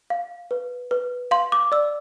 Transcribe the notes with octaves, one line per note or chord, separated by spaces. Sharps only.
F5
B4
B4
F5 C6
D6
D5 E6